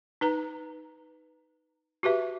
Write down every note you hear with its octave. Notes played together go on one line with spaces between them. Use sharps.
D#4 B4 A#5
F#4 G4 B4 E5